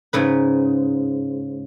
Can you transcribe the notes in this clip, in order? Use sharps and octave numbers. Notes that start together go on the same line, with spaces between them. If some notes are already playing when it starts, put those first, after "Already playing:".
G#2 C#3 B4